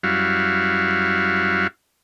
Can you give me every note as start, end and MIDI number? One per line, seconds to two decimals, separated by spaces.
0.03 1.67 42
0.03 1.67 55
0.03 1.67 64
0.03 1.67 66
0.03 1.67 77